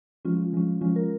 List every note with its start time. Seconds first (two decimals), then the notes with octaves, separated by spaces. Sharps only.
0.25 F3 G#3 C#4 F4
0.53 F3 G#3 C#4
0.81 F3 G#3 C#4 F4
0.96 A#4